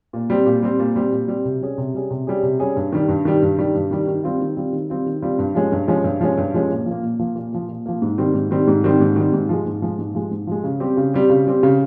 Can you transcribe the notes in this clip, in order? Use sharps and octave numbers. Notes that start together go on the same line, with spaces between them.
A#2
G3 C4
A#2
G3 C4
A#2
G3 C4
A#2
G3 C4
C3
G3 C#4 G#4
C3
G3 C#4 G#4
C3
G3 C#4 G#4
C3
G3 C#4 G#4
G2
D#3 G3
G2
D#3 G3
G2
D#3 G3
G2
D#3 G3
D#3
G3 C4 F4
D#3
G3 C4 F4
D#3
G3 C4 F4
D#3
G3 C4 F4
G2
F3 G#3 C#4
G2
F3 G#3 C#4
G2
F3 G#3 C#4
G2
F3 G#3 C#4
A#2
F3 A#3
A#2
F3 A#3
A#2
F3 A#3
A#2
F3 A#3
G#2
D#3 G3 C4
G#2
D#3 G3 C4
G#2
D#3 G3 C4
G#2
D#3 G3 C4
G#2
F3 G#3
G#2
F3 G#3
G#2
F3 G#3
G#2
F3 G#3
C#3
G3 C4 G4
C#3
G3 C4 G4
C#3
G3 C4 G4
C#3